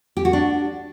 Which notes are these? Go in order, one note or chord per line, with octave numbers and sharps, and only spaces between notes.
G4
F#4
D4